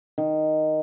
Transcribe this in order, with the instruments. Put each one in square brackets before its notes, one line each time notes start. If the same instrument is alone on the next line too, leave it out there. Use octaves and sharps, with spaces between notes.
[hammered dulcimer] D#3